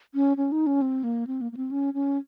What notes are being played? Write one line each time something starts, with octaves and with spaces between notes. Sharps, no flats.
C#4
C#4
D#4
C#4
C4
A#3
C4
A#3
A#3
C4
C#4
C#4